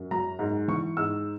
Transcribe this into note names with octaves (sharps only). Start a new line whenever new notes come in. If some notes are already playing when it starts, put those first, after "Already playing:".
Already playing: F#2
F#3 A#5
G#2
E3 C#6
G#2 E6